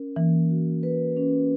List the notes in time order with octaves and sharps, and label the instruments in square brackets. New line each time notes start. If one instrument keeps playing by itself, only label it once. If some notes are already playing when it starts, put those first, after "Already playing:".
Already playing: [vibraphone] C#4 A#4
[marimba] E3 [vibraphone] A#3
[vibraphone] F#4
B4
C#4